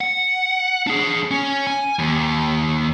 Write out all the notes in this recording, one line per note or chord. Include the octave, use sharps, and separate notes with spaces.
F#5
D4 G#4
C#4
G#5
D#2